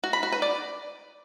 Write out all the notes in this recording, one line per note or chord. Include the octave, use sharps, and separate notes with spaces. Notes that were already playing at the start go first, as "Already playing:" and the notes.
F#4
B5
F#4
B4
D5